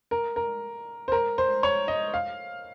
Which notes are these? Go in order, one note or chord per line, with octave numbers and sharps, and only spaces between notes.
A#4
A#4
C5
A#4
C5
C#5
D#5
F5